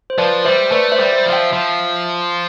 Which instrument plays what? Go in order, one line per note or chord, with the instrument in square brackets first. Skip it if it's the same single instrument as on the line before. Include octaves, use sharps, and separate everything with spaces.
[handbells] C5
[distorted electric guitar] F3 [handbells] B4 D5
[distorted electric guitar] G3 [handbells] C5 E5
[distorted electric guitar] A3 [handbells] B4 D5
[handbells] C5 E5
[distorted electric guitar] G3 [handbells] D5
[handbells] C5 E5
[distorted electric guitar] F3
[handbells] E5 G5
[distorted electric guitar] F3